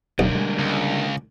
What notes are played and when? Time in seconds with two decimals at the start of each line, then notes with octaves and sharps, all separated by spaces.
0.19 D1 B1 D3 A#3
0.35 G3 G#3
0.59 C#2